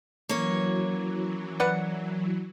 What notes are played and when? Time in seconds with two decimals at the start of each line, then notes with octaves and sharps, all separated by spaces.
0.29 E3 F#3 A#3 C#4 C#5
1.60 B4 D5 F#5